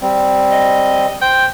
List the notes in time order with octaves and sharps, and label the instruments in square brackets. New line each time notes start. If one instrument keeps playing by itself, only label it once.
[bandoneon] G3 C4
[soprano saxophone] D#5
[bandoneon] C5 [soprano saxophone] G5